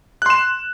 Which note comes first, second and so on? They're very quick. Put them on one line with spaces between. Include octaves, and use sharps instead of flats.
F#6 C6 E7